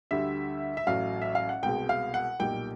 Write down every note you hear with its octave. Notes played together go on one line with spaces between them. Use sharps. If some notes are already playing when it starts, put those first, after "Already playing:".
D2 D3 G3 E5
E5
A1 A2 F#3 F5
E5
F5
F#5
C2 B2 G#3 G5
F5
F#5
B1 A#2 G3 G5